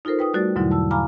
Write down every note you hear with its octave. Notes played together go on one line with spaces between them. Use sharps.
D#4 F4 A4 A#4 C5
B4 G5 D#6
G3 A3 F#4 D5 A6
E2 G#2 B2 D3 F#3 E4
A5 E6
F5 G#5 A#5 B5 D6 F6